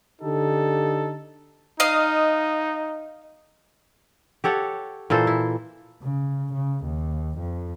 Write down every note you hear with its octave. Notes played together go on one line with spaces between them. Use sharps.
D3 D#4 G4 A4
D#4 D#5 F5
G4 A4 C#5 F#5
A#2 E3 A4 C5
E4
C#3
C#3
D#2
F2